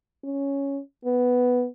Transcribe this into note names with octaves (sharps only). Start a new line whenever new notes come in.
C#4
B3